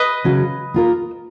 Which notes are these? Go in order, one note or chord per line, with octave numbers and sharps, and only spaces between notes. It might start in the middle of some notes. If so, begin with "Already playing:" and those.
Already playing: B4 D#5
C#3 F#3 C#4 F#4
A#3 F4 A#4